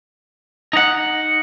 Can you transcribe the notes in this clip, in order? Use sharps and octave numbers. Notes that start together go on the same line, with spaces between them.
D#4 F#5